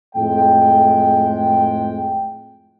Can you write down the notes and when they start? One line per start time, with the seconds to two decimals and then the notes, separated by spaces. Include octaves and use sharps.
0.16 F2 A2 G#3 G5